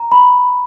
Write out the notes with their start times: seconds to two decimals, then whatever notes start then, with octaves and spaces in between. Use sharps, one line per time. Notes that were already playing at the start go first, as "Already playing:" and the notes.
Already playing: A#5
0.12 B5